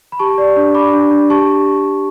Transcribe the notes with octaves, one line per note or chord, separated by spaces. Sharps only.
B5
G4 A5 C#6
D5
D4
D4 B5 D6
D4
D4
G4 A5 C#6